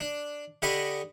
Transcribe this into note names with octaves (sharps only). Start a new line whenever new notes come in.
D4
D3 G4 D#5 B5 C#6